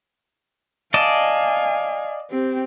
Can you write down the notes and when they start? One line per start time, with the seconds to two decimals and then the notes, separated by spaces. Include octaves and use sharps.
0.94 D5 D#5 F5 G#5 A5
2.30 C4 G4